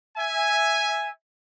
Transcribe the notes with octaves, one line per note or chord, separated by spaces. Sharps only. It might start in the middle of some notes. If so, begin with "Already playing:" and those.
E5 G#5